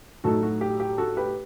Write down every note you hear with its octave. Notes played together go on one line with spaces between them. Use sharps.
A2 F#3 A3 D#4 F#4 A4
F#4
G4
G4
F#4 A4
G4 B4